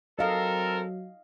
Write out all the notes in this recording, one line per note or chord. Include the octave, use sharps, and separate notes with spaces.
F#3 C4 A4 A#4 D#5 F5